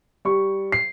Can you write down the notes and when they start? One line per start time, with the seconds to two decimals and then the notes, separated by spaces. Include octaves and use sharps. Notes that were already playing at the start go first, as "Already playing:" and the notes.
0.25 G3 C#6
0.72 C7